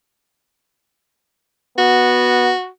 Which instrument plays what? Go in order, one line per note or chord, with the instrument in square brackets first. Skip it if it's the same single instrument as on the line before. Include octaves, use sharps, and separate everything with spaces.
[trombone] B3 [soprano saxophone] F#4